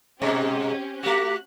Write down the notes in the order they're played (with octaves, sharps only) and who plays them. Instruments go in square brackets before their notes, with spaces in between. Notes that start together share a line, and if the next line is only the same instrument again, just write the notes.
[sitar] G#2 B2 G#3 [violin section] C4 C#4 G4
[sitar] A3 F#4 [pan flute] G4 [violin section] F#6